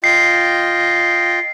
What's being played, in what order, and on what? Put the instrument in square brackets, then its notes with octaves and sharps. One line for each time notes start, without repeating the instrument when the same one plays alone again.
[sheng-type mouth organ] F4 D#5 G5 [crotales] C7